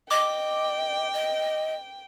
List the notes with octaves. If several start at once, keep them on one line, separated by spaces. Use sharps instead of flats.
D#5 G5 D6
D#5